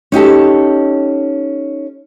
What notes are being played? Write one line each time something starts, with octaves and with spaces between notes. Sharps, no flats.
C#4 D#4 G4 A4